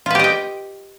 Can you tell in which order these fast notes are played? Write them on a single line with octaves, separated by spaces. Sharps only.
F4 B4 G4 D#5 G5